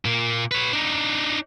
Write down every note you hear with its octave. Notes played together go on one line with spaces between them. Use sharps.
A#2 A#3
B4 C#5
D4 D#4